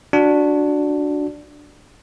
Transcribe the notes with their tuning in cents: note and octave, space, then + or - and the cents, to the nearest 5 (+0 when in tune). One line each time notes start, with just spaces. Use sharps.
D4 +0 F#4 -10